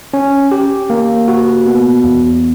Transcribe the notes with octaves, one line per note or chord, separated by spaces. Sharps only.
C#4
G4
A#3
F#4
B3
E2